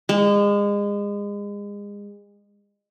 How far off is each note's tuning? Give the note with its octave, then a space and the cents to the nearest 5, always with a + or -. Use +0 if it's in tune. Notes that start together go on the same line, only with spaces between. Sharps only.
G#3 -30